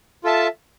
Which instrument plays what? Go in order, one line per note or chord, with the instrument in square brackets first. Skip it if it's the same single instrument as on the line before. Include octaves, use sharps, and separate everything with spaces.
[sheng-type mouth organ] F4 A4 E5 A5